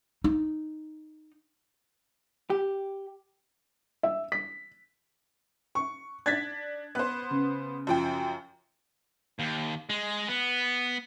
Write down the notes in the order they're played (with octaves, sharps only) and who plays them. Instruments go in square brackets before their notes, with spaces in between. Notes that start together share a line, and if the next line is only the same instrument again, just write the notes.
[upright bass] D#4
[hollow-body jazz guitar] G4
[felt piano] E5
B6
C#6
[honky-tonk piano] D4 [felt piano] G#6 A6 B6
[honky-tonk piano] B3 C5 [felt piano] F#6
[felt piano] C#3
[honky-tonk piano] F#2 F3 G5
[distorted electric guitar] D#2
G#3
B3